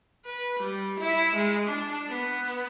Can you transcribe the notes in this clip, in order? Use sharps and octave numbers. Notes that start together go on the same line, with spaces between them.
B4
G3
E4
G#3
D4
B3